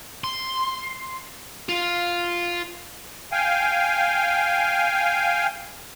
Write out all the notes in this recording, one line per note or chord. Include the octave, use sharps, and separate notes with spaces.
C6
F4
F5 G5 G#5